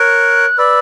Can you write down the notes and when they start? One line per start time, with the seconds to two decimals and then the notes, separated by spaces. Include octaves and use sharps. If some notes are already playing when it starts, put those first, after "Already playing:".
Already playing: A#4 C#5 F#6
0.58 B4 D5 E6